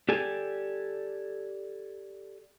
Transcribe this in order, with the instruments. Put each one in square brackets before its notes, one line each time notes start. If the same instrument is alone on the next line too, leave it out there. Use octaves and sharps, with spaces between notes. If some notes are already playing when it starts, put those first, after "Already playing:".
[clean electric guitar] G4 A4 D5 G#5